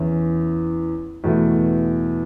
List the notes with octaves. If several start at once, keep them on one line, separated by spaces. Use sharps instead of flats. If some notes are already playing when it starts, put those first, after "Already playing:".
Already playing: E2 E3 C#4
E2 B2 A3